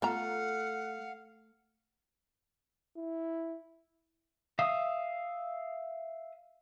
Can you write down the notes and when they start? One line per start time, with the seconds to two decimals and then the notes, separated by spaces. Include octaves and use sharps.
0.02 A3 B3 F4 F5 F#5 A#5
2.97 E4
4.59 E5 F5 D#6